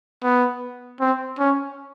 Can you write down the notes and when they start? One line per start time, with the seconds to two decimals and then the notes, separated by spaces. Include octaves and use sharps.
0.23 B3
1.00 C4
1.39 C#4